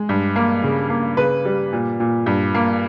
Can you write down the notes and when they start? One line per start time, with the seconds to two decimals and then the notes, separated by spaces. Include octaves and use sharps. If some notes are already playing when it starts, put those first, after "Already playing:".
Already playing: G#3
0.09 G2
0.36 A#3
0.64 C#3
0.90 A#3
1.17 C#3 B4
1.45 G3
1.73 A#2
2.00 A#2
2.26 G2
2.55 A#3